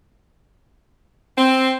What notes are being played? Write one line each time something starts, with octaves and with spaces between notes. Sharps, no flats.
C4